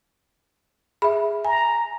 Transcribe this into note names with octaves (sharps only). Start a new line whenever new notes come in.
G#4 E5 B5
G#5 A#5